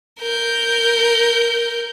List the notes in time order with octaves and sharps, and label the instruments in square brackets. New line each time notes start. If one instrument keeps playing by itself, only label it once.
[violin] A#4 G6